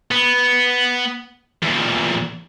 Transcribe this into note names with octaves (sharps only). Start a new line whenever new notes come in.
B3
E2 A#2